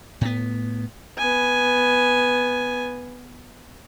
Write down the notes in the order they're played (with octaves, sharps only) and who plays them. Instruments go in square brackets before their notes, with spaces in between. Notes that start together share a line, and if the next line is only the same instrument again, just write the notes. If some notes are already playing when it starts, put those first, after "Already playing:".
[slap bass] A2 B3
[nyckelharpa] B3 G#5